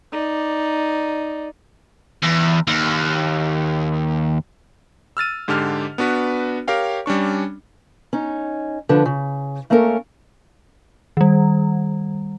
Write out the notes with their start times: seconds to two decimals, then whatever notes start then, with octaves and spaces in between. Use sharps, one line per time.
0.12 D#4 D5
2.23 E2
2.67 D#2
5.17 E6 F6 A6 D#7
5.48 G#2 D3 G4 A5 F6
5.98 B3 D4 F#4 B4
6.68 G4 A#4 C#5 F5 G5
7.06 G3 C#4 D4 C#6
8.13 C#4 D#4
8.89 D3 F3 B4
9.05 C#3
9.70 A3 A#3 C#4 A4 A#4
11.17 D#3 G3